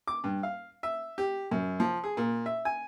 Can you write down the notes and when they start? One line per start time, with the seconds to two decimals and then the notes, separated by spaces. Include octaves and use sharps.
0.07 D6
0.24 G2
0.43 F5
0.83 E5
1.18 G4
1.51 F#2
1.80 F3
2.04 G#4
2.17 A#2
2.46 E5
2.65 G#5